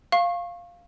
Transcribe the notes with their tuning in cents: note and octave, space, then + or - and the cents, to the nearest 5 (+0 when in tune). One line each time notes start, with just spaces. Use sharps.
F5 +0 C#6 -30